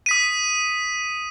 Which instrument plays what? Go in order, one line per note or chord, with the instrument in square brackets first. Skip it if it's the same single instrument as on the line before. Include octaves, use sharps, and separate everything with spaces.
[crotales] D#6 B6 D#7